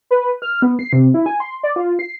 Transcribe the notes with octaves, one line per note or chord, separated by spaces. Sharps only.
B4
F6
B3
C7
C3
E4
G#5
C6
D5
F4
C7